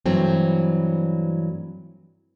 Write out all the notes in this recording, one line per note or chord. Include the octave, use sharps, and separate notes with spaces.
G2 E3 F#3 A3 C4